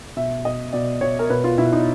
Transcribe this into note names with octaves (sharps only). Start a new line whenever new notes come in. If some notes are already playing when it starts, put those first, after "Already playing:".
B2 E5
B2 D#5
B2 D5
B2 C#5
A#4
B2 B4
F4
B2 E4
D#4